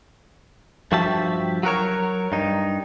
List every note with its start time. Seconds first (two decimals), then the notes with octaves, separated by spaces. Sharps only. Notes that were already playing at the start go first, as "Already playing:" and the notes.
0.92 G2 F3 F#4 G4 E5 A5
1.63 F#3 F#4 A#4 C#5
2.32 G2 D#4